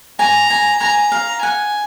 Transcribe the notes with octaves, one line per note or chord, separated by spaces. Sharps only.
G#5 A#5
G#5
G#5 A#5
F5
F#5 G#5